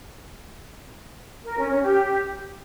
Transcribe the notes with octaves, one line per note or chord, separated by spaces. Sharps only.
A#4
C#4
C#4
G4